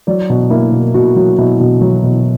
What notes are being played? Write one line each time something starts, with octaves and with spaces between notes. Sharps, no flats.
F#3 D5
B2
A#3 E4
B2
B2 F#4
F#3 F#4
B2 E4
B2 F#4
F#3
B2